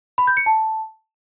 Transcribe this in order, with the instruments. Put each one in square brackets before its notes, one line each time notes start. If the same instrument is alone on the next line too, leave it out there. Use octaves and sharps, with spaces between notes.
[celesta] B5
G6
C#7
A5